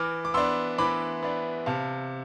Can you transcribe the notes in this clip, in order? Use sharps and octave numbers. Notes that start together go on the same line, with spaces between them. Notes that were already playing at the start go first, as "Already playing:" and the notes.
Already playing: E3 D6 F6
D6
B3 D4 C6 E6
E3 B5 D6
B3 D4
C3 F5 A5